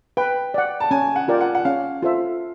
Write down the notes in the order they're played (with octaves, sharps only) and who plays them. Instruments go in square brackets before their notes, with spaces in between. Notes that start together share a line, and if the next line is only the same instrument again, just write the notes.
[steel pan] B4 [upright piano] G5
[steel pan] D5 F#5
[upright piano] A5
[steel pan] C#4 [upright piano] G#5
[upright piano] F#5
[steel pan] F4 A#4 D5 G5
[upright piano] F#5
F#5
[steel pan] C#4 [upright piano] F5
[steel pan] F4 A4 C5 E5